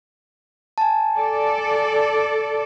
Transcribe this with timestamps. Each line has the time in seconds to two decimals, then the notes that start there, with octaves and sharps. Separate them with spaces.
0.78 G#5 A5
1.16 A4 D5